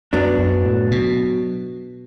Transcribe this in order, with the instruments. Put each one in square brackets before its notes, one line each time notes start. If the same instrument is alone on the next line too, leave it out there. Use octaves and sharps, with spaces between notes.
[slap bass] F#2 [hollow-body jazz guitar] F#3 B3 D4
[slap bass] F#2
A2
B2